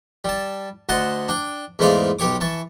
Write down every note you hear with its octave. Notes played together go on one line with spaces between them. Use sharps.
G3 A5
D2 D#5 F#5 A5 C6
D4 G5
E2 G#2 A3 C5 D5 F5
B1 G4 C#5 D6
E3 A5 C#6